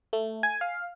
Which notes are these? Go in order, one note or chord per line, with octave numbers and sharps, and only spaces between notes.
A3
G#5
F5